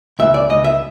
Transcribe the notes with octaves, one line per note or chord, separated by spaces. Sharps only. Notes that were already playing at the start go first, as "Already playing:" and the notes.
C#2 E5
D5
C#2 D#5
E5